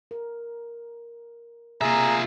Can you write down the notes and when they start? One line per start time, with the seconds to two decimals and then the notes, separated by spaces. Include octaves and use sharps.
0.11 A#4
1.81 C3 A#3 F4 G#4 E5 A#5